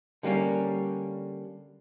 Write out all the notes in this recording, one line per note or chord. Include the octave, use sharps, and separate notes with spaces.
D3 G3 A#3 C#4